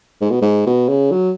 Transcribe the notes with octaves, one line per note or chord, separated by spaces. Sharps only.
G#2
B2
G#2
B2
C#3
F#3